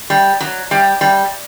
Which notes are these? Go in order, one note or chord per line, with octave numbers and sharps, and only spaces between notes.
G3
F#3
G3
G3